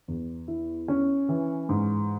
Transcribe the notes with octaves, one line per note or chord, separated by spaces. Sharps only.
E2
E4
C#4
E3
G#2